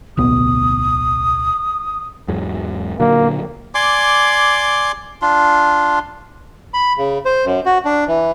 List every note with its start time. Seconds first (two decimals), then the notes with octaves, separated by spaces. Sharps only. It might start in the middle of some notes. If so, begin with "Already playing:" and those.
0.17 D1 B1 B3 D#6
2.28 E2 G#2 F#3
3.00 A#2 D3 F#3 A#3
3.75 D5 G#5 C6 D6
5.22 D4 F4
6.74 B5
6.98 C#3
7.25 C5
7.46 F#2
7.66 F#4
7.85 D4
8.08 E3